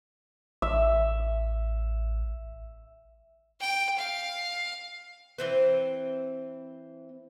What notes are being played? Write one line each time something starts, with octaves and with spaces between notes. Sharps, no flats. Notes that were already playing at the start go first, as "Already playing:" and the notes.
A1 E5
G5
F5
E3 C4 B4